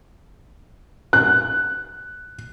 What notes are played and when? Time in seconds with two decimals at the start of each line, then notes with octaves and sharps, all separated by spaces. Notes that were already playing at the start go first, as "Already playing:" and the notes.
1.13 F#6